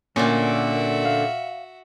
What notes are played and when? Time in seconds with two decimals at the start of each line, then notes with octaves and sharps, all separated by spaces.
0.16 A#2 D3 A#3 C#4 F#4 E5
1.05 F5